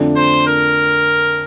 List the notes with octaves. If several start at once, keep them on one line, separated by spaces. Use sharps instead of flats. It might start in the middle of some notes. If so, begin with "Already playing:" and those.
Already playing: F2 D3 A3 D4 F4
C5
A#4